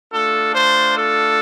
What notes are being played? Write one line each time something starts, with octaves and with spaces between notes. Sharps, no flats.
A3 D4 F4 A4
C5
A4